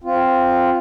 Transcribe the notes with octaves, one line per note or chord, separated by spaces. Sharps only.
C4 F4